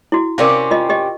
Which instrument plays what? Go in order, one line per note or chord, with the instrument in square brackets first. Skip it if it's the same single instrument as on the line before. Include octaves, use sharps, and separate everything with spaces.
[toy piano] E4 F#4
[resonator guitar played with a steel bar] C3 C4 C#4 [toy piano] A#4 D5 F5
[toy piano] F4 D#5
G4 D#5